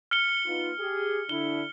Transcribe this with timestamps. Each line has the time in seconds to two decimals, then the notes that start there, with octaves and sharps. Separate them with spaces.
0.11 F6 C#7 G7
0.45 B3 D#4 F4
0.79 G4 G#4
1.29 D3 D4 E4 G7